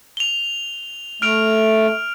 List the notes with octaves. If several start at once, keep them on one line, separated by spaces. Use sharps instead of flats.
F7 G7
A3 F6 D7 F7